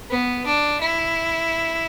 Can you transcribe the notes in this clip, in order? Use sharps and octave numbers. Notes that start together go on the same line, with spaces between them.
B3
D4
E4